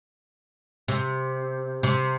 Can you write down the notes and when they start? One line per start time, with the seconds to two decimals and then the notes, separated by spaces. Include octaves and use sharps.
0.88 C3
1.83 C3